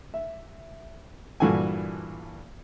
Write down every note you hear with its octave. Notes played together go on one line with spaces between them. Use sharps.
E5
G2 A#2 E3 F#4 A4 G#5